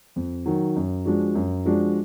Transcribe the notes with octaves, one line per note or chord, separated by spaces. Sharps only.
F2
D#3 F#3
F#2
F3 G#3 D4 F#4
F#2
F3 G#3 D4 F#4